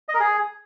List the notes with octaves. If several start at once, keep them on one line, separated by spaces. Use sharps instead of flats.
D#5
A#4
G#4